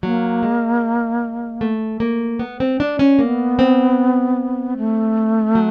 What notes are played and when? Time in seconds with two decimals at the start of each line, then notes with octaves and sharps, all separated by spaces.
0.03 F#3 A#3
0.43 G#3
1.61 A3
2.00 A#3
2.39 B3
2.60 C4
2.80 D4
2.99 C#4
3.19 A#3 B3
3.59 C4
4.77 A3
5.55 F#3